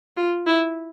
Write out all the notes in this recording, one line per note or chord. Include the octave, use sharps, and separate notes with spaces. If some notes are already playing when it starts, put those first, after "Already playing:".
F4
E4